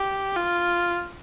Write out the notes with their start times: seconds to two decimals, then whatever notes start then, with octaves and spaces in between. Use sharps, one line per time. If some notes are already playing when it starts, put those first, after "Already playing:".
Already playing: G4
0.37 F4